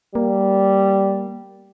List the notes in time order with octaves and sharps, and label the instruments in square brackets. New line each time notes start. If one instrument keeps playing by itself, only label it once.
[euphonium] G3 [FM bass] A#3